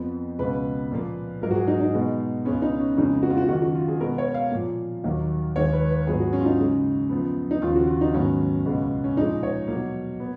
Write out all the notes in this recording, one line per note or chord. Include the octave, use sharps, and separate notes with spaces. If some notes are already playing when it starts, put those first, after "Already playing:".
Already playing: F2 F3 B3
C#2 B2 G#3 B3 B4
A#2 F3 A#3
G#2 F#3 A#3 A#4
F#4
G#4
D#4
D#4
B2 G#3 B3
C#2 C#3 G#3 B3 C#4
D#4
C#4
F2 C#3 G#3 B3 D#4
F#4
F4
F#4
F#2 D#3 A#3 F#4
F#4
F4
G#4
B2 G#3 B3 A#4
C#5
F5
A#2 F3 A#3
D#2 D#3 F#3 A#3
D#2 D#3 G#3 C#5
B4
B4
G#2 F#3 B3 G#4
F#4
C#4
F4
D#4
F#2 C#3 G#3
F#2 F3 B3
D#4
D#2 C#3 F3 A#3 F4
F#4
F4
D#4
G#2 D#3 F#3 B3 C#4
C#2 B2 G#3 B3
C#4
A#2 F3 G#3 D#4
C#5
B2 F#3 A#3
B3